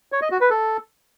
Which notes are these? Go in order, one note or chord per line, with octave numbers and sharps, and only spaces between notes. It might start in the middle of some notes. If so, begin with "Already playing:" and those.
C#5
D#5
F#4
B4
A4